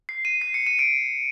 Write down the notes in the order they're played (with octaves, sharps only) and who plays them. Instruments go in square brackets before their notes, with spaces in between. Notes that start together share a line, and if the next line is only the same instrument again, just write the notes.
[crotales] C7
D#7
C7
C#7
D#7
D7